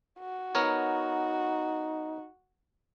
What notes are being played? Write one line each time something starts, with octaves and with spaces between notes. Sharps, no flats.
F#4
B3 D#4 A#4 C#5